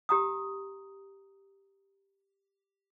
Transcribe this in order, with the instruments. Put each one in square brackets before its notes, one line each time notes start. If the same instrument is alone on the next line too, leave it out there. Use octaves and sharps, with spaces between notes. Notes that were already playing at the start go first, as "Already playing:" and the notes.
[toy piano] G4 A#5 D#6